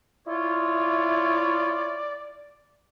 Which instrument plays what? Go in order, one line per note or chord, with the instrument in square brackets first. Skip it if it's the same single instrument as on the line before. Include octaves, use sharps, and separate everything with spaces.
[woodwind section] E4 F4 C#5 [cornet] D5